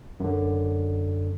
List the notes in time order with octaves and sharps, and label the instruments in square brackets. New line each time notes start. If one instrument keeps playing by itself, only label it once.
[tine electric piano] F#2 D3